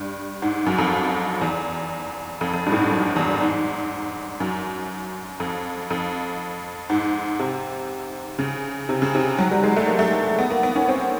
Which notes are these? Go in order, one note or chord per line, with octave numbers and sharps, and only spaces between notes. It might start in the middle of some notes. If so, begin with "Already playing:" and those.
Already playing: G2
G#2
F#2
F2
E2
F2
F2
G2
A2
G#2
F#2
E2
G#2
F#2
F2
F2
G#2
C3
C#3
C3
C#3
C3
F#3
G3
G#3
A3
A#3
A3
B3
A#3
B3
C#4
C4